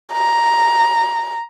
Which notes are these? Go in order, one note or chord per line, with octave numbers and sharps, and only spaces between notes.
A#5